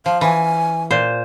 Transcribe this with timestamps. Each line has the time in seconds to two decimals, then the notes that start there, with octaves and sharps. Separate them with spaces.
0.06 F3 F5
0.21 E3 G#5
0.91 A#2 C5